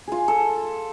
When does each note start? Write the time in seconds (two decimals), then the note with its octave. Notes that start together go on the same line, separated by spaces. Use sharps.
0.07 F4 G#4
0.28 A4